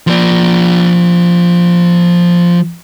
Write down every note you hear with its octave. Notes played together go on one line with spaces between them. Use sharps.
F3 D5